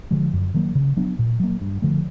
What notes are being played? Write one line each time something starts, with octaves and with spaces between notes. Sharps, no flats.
D3 F3 G#3
F#2
D#3 F#3 A#3
C#3
F#3 B3 D4
A#2
F#3 A#3
G2
D3 F3 A3